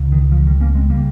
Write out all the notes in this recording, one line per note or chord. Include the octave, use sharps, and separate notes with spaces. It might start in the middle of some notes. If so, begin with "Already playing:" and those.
Already playing: C#2 C#3
D#3
F3
D#3 G3
A#3 C#4
G#3 C4
C#3 G3 A#3